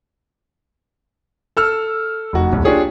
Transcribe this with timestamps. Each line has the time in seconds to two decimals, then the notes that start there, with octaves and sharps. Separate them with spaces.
1.57 A4 E6 F6
2.33 F1 F#4
2.52 D#1 C2
2.64 D4 F4 G4 G#4 C#5